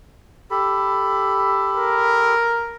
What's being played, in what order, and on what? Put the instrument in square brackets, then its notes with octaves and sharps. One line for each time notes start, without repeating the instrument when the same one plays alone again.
[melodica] G4 A4 B5
[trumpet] A#4